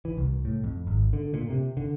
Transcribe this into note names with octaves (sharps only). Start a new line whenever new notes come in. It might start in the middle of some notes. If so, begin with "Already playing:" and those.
E3
C2
A2
F2
G#1
D3
A#2
C3
D3